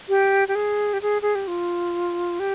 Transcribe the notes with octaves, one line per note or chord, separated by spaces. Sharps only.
G4
G4
G#4
G4
G#4
G#4
G4
F4
G4